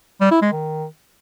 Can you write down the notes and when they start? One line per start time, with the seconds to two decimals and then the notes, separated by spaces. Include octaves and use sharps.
0.21 G3
0.31 E4
0.42 G#3
0.52 D#3